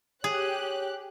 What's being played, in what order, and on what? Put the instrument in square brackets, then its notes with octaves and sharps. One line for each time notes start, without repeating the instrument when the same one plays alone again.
[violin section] G4 F#6 [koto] G#4 [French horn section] C#5